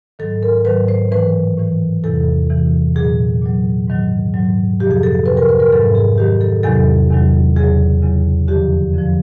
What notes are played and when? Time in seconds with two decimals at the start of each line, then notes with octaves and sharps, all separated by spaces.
0.19 G#2 D#3 F#3 A4
0.43 A#4
0.65 G#2 D#3 F#3 B4
0.88 C5
1.11 A2 E3 B4
1.57 A2 E3
2.04 E2 C3 E3 A4
2.50 E2 C3 E3
2.95 A#2 F#3 G#4
3.42 A#2 F#3
3.88 G#2 D#3 F#3
4.34 G#2 D#3 F#3
4.80 F2 C3 F3 G4
4.91 G#4
5.03 A4
5.26 F2 C3 F3 B4
5.37 A#4
5.49 B4
5.60 A#4
5.72 G#2 D#3 F#3 A4
5.95 G#4
6.18 G#2 D#3 F#3 G4
6.41 A4
6.63 E2 C3 D#3 F#3 A4
7.10 E2 C3 D#3 F#3
7.56 E2 C#3 F#3 G#4
8.02 E2 C#3 F#3
8.48 F2 D3 F3 G4
8.94 F2 D3 F3